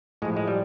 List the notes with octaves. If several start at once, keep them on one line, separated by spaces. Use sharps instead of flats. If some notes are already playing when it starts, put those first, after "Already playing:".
A2 F3 G#3
G#3
G3